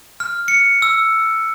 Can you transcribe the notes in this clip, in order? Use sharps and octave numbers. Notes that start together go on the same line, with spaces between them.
F6
C#7
E6